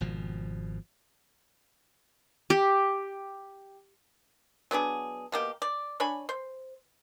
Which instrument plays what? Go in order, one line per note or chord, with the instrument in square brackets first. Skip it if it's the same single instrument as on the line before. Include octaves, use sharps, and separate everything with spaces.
[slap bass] G#1 B2 F3
[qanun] G4
[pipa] F#3 B3 D4 G#4
B2 A#3 G4
D5
D4 C#5 G#5 B5
C5